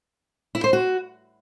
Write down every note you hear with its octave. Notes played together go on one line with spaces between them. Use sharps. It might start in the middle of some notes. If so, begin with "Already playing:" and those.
E4
C5
F#4